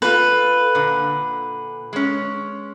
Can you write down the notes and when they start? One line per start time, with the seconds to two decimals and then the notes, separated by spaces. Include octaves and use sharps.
0.02 F4 A4 B4
0.75 A#2 D3
1.93 G#3 C#4